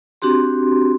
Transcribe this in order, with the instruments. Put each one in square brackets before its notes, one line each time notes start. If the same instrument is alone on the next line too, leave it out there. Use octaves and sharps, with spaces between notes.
[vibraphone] C4 D4 F#4 G4 C6